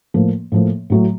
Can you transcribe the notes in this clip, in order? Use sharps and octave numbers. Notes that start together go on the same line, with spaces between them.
A2 F3 A#3
A2 F3 A#3
A2 F#3 A3